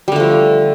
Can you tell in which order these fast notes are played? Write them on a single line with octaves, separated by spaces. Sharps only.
G3 D3 A3 F3